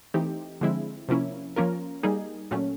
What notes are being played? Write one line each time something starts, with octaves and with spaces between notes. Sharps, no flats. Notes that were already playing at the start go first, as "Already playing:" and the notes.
E3 A3 C4 D#4 G4
D3 F3 G#3 C4 E4
C3 F3 A#3 C#4 E4
F3 A#3 C#4 F4 A#4
G3 A#3 D#4 G#4
A#2 F#3 A3 C#4